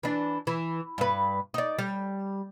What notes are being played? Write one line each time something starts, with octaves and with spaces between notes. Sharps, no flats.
E3 D4
E3
G2 B4
D#4 D5
G3